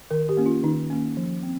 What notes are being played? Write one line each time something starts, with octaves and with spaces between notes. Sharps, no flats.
D#3 A#4
G4
A#3 C#4
F4
D#3 D#4
A#3 C#4
F3
C4